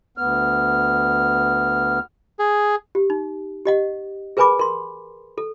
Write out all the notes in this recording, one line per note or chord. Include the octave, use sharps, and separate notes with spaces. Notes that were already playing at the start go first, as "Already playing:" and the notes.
D2 B3 F6
G#4
G4
D#4
G4 D#5 F#5
G#4 A#4 B4 G#5 B5 D6
A#4 C6
A4